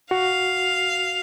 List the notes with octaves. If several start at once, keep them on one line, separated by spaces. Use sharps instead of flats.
F#4 F5